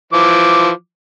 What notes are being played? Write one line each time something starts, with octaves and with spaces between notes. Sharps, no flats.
E3 F3 D6